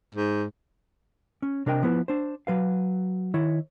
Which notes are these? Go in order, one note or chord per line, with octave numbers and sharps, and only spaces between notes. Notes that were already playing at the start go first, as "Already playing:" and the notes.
G#2
C#4
C3 D4 A#4 D#5 G5
F3 B3 E4 B4
D4 C5
F#3 B4 F5
D#3 E4 C#5